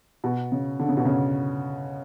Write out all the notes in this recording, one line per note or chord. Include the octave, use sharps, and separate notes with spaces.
B2
C#3
D3
C#3
B2
C#3